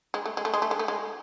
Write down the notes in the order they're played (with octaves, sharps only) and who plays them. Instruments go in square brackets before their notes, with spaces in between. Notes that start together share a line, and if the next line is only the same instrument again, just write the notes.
[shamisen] G#3
A3
G#3
A3
G#3
A3
G#3
A3
G#3